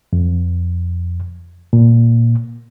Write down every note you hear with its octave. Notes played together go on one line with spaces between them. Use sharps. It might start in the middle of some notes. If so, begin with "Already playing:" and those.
F2
A#2